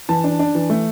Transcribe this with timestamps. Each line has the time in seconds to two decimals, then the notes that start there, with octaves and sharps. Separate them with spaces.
0.09 E3 A5
0.24 D4
0.39 D4
0.55 E3
0.70 A3